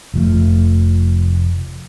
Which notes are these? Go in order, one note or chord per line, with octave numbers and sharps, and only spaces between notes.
F1 F3 A3